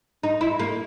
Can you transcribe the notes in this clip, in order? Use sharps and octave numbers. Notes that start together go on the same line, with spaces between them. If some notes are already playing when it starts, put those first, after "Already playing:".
D#4
E4
A#3